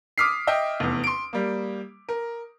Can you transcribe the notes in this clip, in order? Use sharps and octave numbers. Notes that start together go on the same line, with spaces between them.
D6 D#6 F6 B6 C7
D#5 E5 G5
F1 E2
C6 D7
G3 A#3
A#4